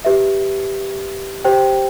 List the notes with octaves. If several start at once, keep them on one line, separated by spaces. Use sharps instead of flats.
G4 B4 E5
G4 C5 G5